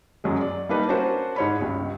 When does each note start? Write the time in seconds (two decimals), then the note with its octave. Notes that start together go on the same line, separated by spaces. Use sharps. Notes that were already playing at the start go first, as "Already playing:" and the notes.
0.24 F#2 F#3 G#3
0.41 D5
0.69 G3 A#3 D4 D#4 B4
0.88 C#4 D4 F#4 A#4 C5
1.36 G#2 C#5 B5
1.60 C#2 G2